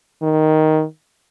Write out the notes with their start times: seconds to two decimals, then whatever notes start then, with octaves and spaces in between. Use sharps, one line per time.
0.22 D#3